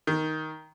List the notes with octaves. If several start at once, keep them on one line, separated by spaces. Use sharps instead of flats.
D#3